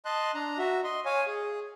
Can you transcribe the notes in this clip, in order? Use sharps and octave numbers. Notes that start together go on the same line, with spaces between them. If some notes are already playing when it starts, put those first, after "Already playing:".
D#5 A5 C6 F#6
D4 A#5
F#4 E5
D#5 C6
C#5 F5 G#5
G#4